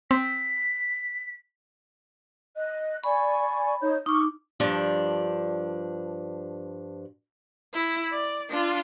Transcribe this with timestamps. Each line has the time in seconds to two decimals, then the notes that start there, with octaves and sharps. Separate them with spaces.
0.11 C4 B6
2.55 D#5 F#6
3.04 D5 G#5 B5 C#6
3.81 D#4 C#5 G6
4.06 D#4 C#6 D6 F6
4.60 G2 F3 D4
7.74 E4
8.13 D5
8.50 D4 F4